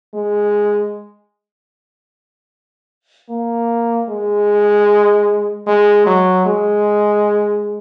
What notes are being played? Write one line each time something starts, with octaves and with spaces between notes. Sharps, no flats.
G#3
A#3
G#3
G#3
F#3
G#3